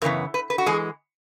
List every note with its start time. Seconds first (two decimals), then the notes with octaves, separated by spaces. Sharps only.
0.02 F#2 C#3 E3 B3 A#4
0.34 B4
0.50 B4
0.58 F#4
0.66 E3 G#3 G#4